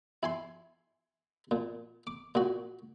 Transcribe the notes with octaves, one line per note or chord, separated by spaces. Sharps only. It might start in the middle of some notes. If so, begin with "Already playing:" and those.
E4 G#5 C6
A#2
D6
A#2 F#4